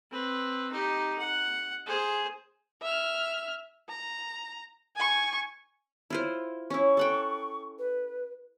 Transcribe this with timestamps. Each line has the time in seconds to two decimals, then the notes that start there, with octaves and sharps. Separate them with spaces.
0.11 C4 B4
0.71 D#4 G4
1.19 F#5
1.86 G#4 C5
2.82 E5 F6
3.89 A#5
4.96 G#5 C#6
6.10 E4 F4 C5
6.70 C#4 E4 C#6
6.97 A4 F#5 G5
7.79 B4